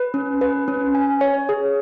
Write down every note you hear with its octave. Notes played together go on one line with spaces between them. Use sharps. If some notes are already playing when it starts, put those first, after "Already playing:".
Already playing: B4
C#4
B4
C#4
G#5
C#5
G#4